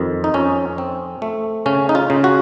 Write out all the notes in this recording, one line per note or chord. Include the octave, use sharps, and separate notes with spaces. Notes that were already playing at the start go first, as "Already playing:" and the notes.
Already playing: F2 D#3
D#4
F2 C#4
C4
A3
C#3 C#4
D#4
F4
C#3
F#4